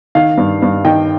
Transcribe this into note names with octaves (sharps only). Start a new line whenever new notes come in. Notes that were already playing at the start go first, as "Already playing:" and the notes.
D#3 F5
G2
G2
D#3 D#5 G5